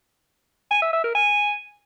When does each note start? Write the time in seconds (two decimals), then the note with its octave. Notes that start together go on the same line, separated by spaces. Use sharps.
0.71 G#5
0.82 E5
0.93 E5
1.04 A#4
1.15 G#5